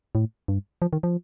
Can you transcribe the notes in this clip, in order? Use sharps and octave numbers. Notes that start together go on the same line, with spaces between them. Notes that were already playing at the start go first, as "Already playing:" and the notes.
A2
G2
F3
D#3
F3